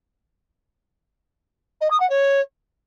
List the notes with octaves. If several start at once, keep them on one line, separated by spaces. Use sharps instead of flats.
D#5
D#6
F#5
C#5